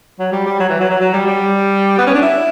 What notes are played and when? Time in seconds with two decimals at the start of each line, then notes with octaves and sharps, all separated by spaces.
0.19 F#3
0.32 G3
0.46 G3
0.60 F#3
0.69 E3
0.80 F#3
0.90 F#3
1.00 F#3
1.14 G3
1.27 G3
1.98 B3
2.07 C#4
2.14 D4
2.22 E4